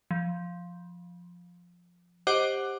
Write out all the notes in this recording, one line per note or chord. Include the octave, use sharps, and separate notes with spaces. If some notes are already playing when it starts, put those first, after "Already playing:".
F3
G4 C5 D#5 F#5 D6 F#6